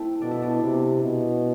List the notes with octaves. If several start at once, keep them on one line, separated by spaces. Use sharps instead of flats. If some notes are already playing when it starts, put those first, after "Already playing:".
Already playing: A3 C4 E4
B2 D4
E4
B3 D4
C3
B2